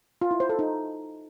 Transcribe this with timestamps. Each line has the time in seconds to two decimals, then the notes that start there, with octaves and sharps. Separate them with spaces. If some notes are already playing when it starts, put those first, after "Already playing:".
0.22 F4
0.31 E4
0.40 C5
0.49 A4
0.59 D#4